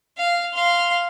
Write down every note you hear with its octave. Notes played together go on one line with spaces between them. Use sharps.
F5
F5 C6